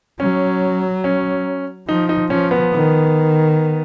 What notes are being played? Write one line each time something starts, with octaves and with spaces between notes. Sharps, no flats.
F#3 C#4
C#4
F3 D#4
D#4
F3 C#4
B3
D#3